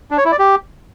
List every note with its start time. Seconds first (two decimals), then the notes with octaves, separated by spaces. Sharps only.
0.11 D4
0.18 C#5
0.25 E4
0.32 D5
0.39 G4